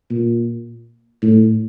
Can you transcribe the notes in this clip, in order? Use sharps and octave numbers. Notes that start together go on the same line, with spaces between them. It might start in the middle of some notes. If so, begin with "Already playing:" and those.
A#2
A2